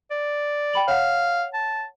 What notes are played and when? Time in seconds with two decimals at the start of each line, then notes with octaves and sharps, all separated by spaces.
0.11 D5
0.73 G5 B5 F#7
0.88 C#5 F5 F#5
1.53 A5